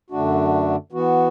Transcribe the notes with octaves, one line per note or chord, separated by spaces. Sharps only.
F#2 D3 A3 D4 F#4
E3 B3 F#4